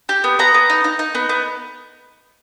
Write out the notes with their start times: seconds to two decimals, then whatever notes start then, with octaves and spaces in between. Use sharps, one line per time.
0.09 G4
0.24 B3
0.39 B3 A#5
0.54 B3
0.70 D#4
0.84 D#4
0.99 D#4
1.15 B3
1.29 B3